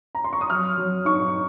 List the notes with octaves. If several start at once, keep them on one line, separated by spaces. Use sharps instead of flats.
A#5
C6
C#6
D#6
F#3 F6
F#3
D#4 C#6